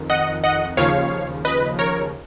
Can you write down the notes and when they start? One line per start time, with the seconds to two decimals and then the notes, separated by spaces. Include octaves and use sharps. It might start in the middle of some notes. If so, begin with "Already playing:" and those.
Already playing: F2 D#3
0.10 D#5 F#5
0.44 D#5 F#5
0.77 D#2 C#3 F3 C#5 F5
1.45 B4 D#5
1.79 A#4 C#5